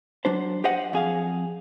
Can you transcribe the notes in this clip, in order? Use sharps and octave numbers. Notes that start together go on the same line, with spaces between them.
F#3 D4 C5
G4 C5 D#5 F#5
F2 G#4 F5